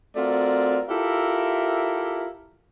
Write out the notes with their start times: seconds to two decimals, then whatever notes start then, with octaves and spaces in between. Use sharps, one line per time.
0.16 A3 C4 F4 F#4 A#4 D5
0.88 E4 F4 G4 A4 A#4 E5